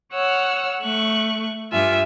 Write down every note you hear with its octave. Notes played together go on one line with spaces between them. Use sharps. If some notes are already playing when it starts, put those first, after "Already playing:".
C#5 F#5 E6 F6
A3 C#6 F#6
G2 F4 E5 G#5